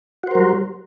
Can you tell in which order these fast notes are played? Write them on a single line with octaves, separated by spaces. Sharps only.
F#4 C5 A#4 F#3 G3